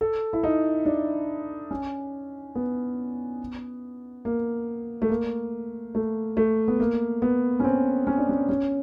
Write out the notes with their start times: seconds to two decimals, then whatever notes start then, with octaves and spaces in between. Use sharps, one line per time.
0.01 A4
0.33 E4
0.43 D#4
0.85 D4
1.71 C#4
2.55 B3
4.25 A#3
5.02 A3
5.10 A#3
5.95 A3
6.37 A3
6.68 B3
6.80 A#3
7.22 B3
7.60 C#4
7.64 C4
8.07 C#4
8.18 D4
8.29 C#4
8.49 C#4